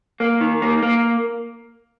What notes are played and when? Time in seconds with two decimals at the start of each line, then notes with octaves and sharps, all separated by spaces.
0.20 A#3
0.41 D#3
0.62 A#3
0.82 A#3